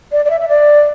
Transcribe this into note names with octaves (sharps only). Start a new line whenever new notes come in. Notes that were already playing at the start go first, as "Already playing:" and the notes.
D5
D5
E5
E5
D5